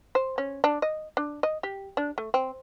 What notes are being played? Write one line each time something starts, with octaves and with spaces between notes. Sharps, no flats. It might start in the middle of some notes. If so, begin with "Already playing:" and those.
C5
C#4
D4
D#5
D4
D#5
G4
D4
A3
C4